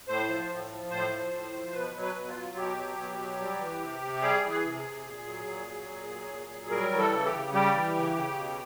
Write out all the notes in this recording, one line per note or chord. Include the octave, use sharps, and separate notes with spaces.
A2 C5
F3
A2
F3
A2 C5
F3
A2
F3
B2 B4
F#3
B4
B2
F4
F#3
B2 G4
F#3
B2
F#3
G3
E3
C3
C3
G3 G#4
E3
G#4
C3
G#4
C3
A#2
F#3
A#2
F#3
A#2
F#3
A#2
F#3
G3 A#4
E3
A4
C#3
G4
C#3
G3 G4
E3
C#3
C#3
B2